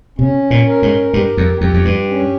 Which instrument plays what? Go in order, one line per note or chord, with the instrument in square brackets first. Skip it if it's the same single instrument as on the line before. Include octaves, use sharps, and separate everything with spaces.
[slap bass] C3 [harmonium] C#4
[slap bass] A#2
[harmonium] A#4
[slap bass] G#2
[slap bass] G2 [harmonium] G4
[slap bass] F2
[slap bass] F2 [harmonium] G4
[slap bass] F2
G2
[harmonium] C#4